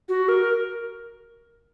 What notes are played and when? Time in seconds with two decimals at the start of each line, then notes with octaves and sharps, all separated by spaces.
0.09 F#4
0.29 A#4